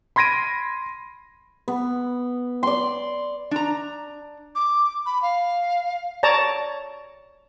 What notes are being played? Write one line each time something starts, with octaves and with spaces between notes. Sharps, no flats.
B5 C6 G#6 A#6 D7 D#7
B3
D5 C6
D4 A#5
D6
B5
F5
C#5 D5 A5 A#5